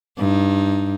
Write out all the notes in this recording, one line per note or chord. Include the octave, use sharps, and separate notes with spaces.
G2 D#4